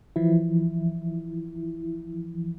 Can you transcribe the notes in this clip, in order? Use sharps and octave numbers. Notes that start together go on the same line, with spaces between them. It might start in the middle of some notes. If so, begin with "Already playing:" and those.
E3 F3 E4